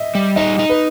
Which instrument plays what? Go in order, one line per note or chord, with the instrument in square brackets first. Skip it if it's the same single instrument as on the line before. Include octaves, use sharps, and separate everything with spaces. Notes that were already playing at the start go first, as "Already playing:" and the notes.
Already playing: [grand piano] D#5 E5
[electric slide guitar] G3
[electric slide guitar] D#4 [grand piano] D#5
[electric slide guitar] D#4
[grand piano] B4